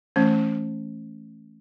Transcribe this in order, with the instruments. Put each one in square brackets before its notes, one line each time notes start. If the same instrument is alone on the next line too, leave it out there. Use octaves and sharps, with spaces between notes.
[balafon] E3 A3 C#4